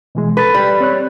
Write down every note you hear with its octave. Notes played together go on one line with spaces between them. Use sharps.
B2 E3 G#3
A4 B4 A6
G3 B5
C4 C#5 F#6